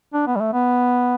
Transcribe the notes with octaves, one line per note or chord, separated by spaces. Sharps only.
D4
B3
G3
A3
B3